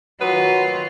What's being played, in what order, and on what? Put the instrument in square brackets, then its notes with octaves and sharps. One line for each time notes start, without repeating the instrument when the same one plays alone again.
[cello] D#3 F4 [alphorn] F#3 [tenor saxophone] B4